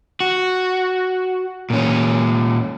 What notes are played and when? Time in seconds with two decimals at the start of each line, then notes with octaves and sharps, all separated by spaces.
0.20 F#4
1.70 A#2 C#4